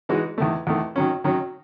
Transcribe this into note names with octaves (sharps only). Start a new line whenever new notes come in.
E3 G#3 D#4 F#4
E2 D#3 A3
E2 D#3 A3
D#3 F#3 C#4
D#3 F#3 C#4